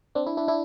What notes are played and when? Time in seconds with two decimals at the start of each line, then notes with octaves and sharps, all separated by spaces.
0.15 C4 D4
0.26 D4 E4
0.37 D4 E4
0.48 D4 E4